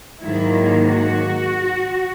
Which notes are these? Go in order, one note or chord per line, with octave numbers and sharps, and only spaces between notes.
G#2 D#3 F#3 A#3 E4
F#4